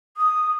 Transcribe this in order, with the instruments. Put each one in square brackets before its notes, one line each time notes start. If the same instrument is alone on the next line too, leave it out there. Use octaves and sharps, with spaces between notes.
[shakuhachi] D#6